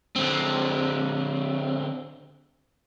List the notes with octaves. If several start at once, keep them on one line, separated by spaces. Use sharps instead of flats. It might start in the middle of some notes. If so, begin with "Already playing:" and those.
D3 C4